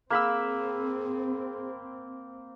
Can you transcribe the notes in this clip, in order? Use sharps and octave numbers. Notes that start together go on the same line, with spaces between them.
A#3 C4 G#4 B5 E6